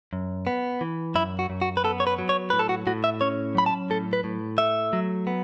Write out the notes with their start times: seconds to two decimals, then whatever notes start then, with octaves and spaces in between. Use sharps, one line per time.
0.13 F#2
0.47 B3
0.81 E3
1.15 F#2 E4
1.39 F#4
1.50 F#2
1.62 F#4
1.77 B4
1.84 B3 A4
2.00 C#5
2.07 B4
2.18 F#3
2.29 C#5
2.50 A2 B4
2.59 A4
2.69 F#4
2.87 A2 F#4
3.04 E5
3.21 C#4 C#5
3.55 F#3 B5
3.66 A5
3.90 A2 A4
4.13 B4
4.24 A2
4.58 A3 E5
4.93 F#3
5.27 B3